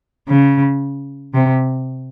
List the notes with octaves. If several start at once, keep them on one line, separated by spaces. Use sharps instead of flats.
C#3
C3